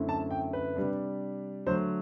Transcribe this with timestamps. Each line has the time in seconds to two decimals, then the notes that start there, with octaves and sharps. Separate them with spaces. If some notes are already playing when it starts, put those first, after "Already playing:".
Already playing: F#2 D3 A3 C4 E4
0.09 A5
0.31 G5
0.53 B4
0.76 C3 G3 D4
1.67 D3 F#3 A3 C5